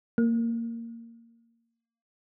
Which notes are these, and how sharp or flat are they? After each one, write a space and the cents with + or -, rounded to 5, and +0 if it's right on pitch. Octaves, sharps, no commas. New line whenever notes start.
A#3 -15